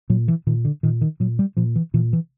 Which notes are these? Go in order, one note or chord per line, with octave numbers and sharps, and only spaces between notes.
A#2 F#3
E3
A#2 D#3
D3
A#2 D#3
D#3
A#2 F#3
G3
A#2 F3
E3
A#2 E3
E3